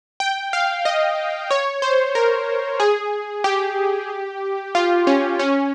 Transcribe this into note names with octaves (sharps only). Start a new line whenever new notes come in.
G5
F5
D#5
C#5
C5
A#4
G#4
G4
F4
C#4
C#4